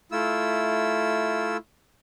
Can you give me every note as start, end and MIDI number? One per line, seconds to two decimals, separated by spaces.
0.12 1.57 57
0.12 1.57 64
0.12 1.57 65
0.12 1.57 88